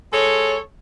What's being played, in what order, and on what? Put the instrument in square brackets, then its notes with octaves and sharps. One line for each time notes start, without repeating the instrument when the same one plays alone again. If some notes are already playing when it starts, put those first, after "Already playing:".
[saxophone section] G#3 A4 C#5